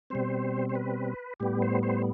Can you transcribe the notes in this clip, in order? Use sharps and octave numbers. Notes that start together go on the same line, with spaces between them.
B2 G3 C4 C5
C5
B4
A2 G3 B3 G4
C5
C5